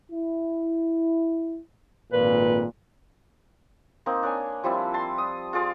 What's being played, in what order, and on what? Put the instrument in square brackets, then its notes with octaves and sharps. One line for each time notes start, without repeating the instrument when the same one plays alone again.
[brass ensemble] E4
[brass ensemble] G#1 F2 A#2 [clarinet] B4
[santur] A#3 C4 D#4
D4 C#5 G#5
F3 G3 C4 E4
A5 C6
D#6
F4 G#4 D5 F5